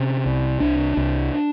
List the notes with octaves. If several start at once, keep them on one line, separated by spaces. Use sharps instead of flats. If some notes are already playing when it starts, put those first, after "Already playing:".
Already playing: C3 C#4
C2
C2 D4
C2